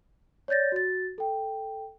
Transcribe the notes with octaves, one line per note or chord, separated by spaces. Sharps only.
C#5 D5 G6 A6 A#6
F#4 A6
A4 G5